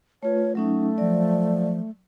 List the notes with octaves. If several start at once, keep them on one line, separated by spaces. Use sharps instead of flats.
A3 F4 B4 C#5
F#3 A3 C#4 D#4
F3 F#3 D5